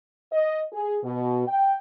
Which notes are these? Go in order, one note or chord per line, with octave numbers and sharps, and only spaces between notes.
D#5
G#4
B2
G5